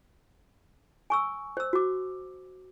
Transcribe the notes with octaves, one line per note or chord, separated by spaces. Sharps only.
G#5 C#6 E6
C5 E6
F#4 D6